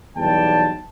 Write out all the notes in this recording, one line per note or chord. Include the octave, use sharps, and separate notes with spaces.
B1 E2 G3 G5 A5